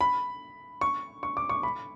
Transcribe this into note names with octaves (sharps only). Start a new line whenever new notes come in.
B5
C#6
C#6
D6
C#6
B5